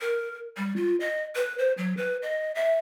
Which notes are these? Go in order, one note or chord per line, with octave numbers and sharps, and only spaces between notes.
A#4
G3
F4
D#5
B4
C5
F#3
B4
D#5
E5